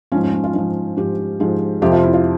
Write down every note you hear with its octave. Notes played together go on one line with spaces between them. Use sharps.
G#2 F3 C#4
C#4
C#4
F4
G#2 F3 F4
G#2 F3 G4
G#2 F3 G#4
F2 C3 F3 G4
F4
E4
F4